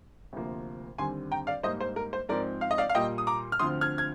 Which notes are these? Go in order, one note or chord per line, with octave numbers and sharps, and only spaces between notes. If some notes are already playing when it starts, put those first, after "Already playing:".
D2 C3 F3 A#3
D#2 D3 G3 C4 G#5 C6
G5 A#5
D5 F5
G#2 G3 A#3 C5 D#5
C5
A#4
C5
G#2 F3 C4 A#4 D5
F5
D#5
D5 F5
F5
A#2 G3 A#3 D#5 G5
D#6
A#5 D6
F6
D2 D3 F3 C4 C6 D#6
F6 G#6
G#6